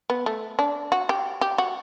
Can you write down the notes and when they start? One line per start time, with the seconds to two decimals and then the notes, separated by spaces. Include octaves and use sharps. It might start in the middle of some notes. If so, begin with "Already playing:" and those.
0.10 B3
0.26 A3
0.59 D4
0.92 F#4
1.09 G4
1.41 G4
1.58 F#4